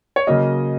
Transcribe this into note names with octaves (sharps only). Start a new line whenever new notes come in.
C#5
C#3 F#3 A#3 D#5